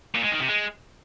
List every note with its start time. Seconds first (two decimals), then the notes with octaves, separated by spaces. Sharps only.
0.15 A#2
0.23 G#3
0.32 D#3
0.40 C3
0.49 G#3